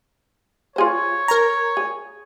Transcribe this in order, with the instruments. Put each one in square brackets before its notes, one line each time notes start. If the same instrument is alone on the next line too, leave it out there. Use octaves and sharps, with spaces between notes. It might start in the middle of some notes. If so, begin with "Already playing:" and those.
[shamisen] F4 G#4 C5 [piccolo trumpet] C#5
[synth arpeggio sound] A#4 A#5
[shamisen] G#4